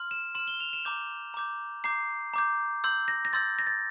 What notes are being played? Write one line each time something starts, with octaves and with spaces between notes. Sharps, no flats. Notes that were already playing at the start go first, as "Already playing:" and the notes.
Already playing: C6 F6
E7
C6 F6 E7
G7
F7
E7
A#5 D6 G6
A#5 D6 G6
A#5 D6 G6 C7
A#5 D6 G6
C6 E6 G6
A#6
A#6
C6 E6 G6 A6
A#6
A6